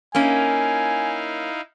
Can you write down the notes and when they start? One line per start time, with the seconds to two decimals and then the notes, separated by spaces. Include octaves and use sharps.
0.15 A#3 C#4 D#4 E4 F5 G#5